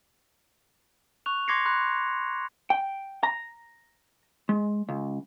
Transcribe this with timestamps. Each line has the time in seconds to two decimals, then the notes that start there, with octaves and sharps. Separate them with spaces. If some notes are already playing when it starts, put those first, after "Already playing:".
1.26 C#6 F#6 F7
1.48 C6 D6 G#6 A#6 C7 C#7
1.65 B5 C6 F#6
2.70 G5
3.23 A#5
4.49 G#3
4.89 C#2